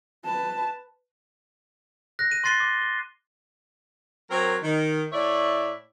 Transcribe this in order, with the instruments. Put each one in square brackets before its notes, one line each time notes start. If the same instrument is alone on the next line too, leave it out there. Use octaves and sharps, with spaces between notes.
[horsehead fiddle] B4 A5
[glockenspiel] F#6 A#6
D#7
C6 F#6 A6 C7 D#7 G7
D6
G7
[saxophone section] F#3 C4 A#4
D#3
A2 E4 C#5 D5 E5